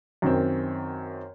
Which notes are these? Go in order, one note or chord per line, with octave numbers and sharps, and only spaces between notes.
F#2 D#3 C4